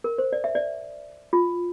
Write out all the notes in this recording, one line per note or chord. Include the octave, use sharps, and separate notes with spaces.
A#4
C5
D5
E5
D5
F4